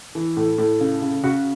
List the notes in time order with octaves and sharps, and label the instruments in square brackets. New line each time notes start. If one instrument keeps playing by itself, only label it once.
[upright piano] E3
A2
A2
C#3
C#3
C#3 F#4